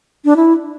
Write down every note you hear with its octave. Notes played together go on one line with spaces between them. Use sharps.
D4
E4